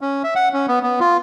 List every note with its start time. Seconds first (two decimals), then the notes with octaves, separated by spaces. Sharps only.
0.01 C#4
0.24 E5
0.35 F#5
0.53 C#4
0.68 B3
0.83 B3
1.00 F4